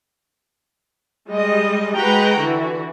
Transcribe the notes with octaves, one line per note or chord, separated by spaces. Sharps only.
G3 G#3 D#5
G#3 F#4 B4 F#5 G5 A#5
D3 E3 F#4